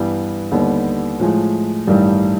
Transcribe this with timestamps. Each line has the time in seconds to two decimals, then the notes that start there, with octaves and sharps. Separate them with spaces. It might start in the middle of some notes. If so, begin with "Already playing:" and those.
Already playing: G2 E3 G3 B3
0.51 D#2 D3 G3 B3
1.19 A2 F3 G#3
1.87 A1 G2 D#3 G3